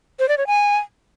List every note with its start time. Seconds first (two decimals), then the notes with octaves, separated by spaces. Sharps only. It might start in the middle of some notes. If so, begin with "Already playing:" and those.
0.19 C5
0.29 D5
0.38 C#5
0.47 G#5